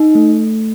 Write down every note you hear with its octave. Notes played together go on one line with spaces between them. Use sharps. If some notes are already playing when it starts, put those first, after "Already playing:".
Already playing: D#4
A3